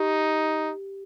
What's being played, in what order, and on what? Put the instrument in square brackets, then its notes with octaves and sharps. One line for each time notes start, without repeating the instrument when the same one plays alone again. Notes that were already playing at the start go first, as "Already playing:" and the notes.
Already playing: [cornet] D#4 [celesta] G4